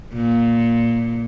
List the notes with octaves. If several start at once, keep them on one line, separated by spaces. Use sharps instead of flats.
A#2